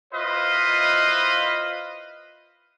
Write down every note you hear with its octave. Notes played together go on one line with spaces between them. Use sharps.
E4 F4 B4 C5 D#5 F5